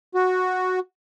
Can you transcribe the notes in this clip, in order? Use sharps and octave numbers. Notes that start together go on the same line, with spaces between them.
F#4